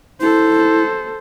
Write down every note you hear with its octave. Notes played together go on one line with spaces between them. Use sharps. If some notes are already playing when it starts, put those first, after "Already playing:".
E4 A4 C5